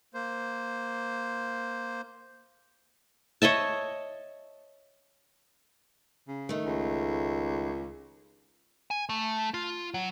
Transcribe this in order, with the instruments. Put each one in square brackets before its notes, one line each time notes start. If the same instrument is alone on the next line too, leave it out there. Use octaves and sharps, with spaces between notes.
[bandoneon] A#3 C5
[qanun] C#5 D#5 E5 A5
[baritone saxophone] C#3
[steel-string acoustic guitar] D#3 A3
[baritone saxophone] C#2
[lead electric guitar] G#5
A3
F4
F#3